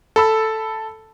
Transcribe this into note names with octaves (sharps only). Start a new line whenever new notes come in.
A4 B5 E6